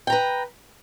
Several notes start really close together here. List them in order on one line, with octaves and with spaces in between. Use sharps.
G5 A#5 B4